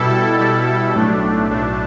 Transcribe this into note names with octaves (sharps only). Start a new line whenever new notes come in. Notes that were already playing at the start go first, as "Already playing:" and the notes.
Already playing: B2 G3 E4 A4
B2 G3 E4 A4
B1 A2 A3 D4
B1 A2 A3 D4